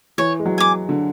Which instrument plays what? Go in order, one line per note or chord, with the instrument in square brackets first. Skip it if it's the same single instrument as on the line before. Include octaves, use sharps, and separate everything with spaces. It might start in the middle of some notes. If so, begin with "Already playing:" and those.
[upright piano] E3 [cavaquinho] C#5
[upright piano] G#3
F#3
[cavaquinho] G#5 D6
[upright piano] D3